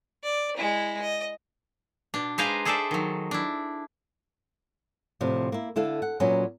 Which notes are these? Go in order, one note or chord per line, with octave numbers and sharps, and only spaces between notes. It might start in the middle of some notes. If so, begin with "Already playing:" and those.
D5
G#3 E4
D#5
B2 D4
G#3 B4 C5 F5 G#5 A#5
G#4 A4 C5 D5 E5 A5
D#3 F#3
D4 E4
D2 A2 C3 F3
A#3 E4
D3 E4 A4 F5
F#5
A#2 F#3 B3 C#4